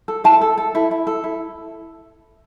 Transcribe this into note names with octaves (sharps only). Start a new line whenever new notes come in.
A4
E4 A4 A5
A4
A4
E4
E4
A4
E4